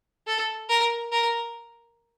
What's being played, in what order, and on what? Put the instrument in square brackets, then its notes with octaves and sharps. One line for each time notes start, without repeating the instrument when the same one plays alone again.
[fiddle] A4
A#4
A#4